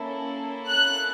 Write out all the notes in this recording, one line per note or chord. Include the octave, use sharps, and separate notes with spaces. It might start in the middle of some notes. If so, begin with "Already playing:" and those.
Already playing: A#3 C#4 E4 A4
F#6